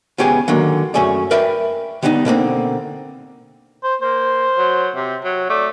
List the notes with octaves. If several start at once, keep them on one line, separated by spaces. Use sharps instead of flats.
C#2 B3 C#4 G4 G#4 G#5
D3 D#3 F#3 A#3
F#2 A3 C#4 G#4 D5
A#4 B4 D5 E5 G5
D3 G3 B3 D4 D#4
B2 D3 A#3 C4
C5
A#3 C5
F#3
C3
F#3
A3 D5